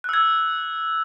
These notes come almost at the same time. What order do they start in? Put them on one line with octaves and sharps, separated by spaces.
F#6 E6 G#6